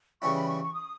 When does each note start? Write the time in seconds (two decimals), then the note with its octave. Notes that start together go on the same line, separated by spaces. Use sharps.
0.22 C#3 E3 G3 C#4 E4 C#6
0.35 B5
0.48 C#6
0.61 C#6
0.74 D#6